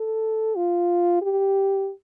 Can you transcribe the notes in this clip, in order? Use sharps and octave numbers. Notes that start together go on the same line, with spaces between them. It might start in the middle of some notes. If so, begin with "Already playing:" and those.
Already playing: A4
F4
G4